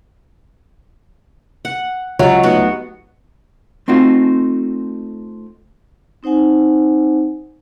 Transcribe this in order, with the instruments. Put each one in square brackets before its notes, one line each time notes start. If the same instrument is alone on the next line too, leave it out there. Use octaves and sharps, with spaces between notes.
[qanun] F#5
[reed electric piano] C#2 C#5 E5 [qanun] F#3 [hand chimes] F4 G4 D#5
[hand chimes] A3 D#4 C#7 [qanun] B3 F#4
[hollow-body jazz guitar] A3 C4 D#4 F4 F#4
[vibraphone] C4 D#4 C5 F#5 G#5